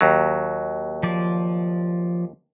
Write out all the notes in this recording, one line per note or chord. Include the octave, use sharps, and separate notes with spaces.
D#2 F#3
F3 D5